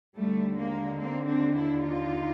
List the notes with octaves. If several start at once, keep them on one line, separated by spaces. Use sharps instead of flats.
D#2 D3 G3 A3
G#3 A#3
A#3 C4
C4 D4
D4 E4
D#4 F4